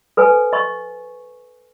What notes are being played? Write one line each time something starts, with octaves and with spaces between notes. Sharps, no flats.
A4 B4 C5 G#5
D#5 C#6